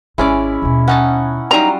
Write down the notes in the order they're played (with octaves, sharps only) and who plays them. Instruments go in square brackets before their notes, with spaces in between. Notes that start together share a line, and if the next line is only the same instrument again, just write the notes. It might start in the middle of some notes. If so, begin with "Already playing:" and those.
[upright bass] G#1 [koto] G#3 D5 [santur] C#4 E4
[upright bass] D#2 B2
[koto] C#4 D#4 A5 [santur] F#5
[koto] F#3 G3 F4 [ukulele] D#4 A#5